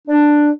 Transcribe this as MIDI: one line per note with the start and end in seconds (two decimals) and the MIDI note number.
0.08 0.50 62